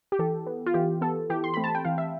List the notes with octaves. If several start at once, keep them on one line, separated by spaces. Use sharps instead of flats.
G4
E3 A4
B3
F4
E3 G4
B3 A4
E3 G4
C6
A3 C4 B5
A5
G5
E3 F5
E5